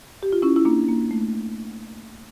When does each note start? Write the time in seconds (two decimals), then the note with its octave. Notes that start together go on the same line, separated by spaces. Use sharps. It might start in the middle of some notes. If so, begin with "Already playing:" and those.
0.23 G4
0.32 F4
0.42 C#4 E4
0.56 E4
0.65 A#3 D4
0.88 A#3
1.11 A3